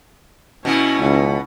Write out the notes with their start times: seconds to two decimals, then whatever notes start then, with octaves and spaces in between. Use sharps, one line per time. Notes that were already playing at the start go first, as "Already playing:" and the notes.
0.65 B2 B3 C#4 E4
1.00 C#2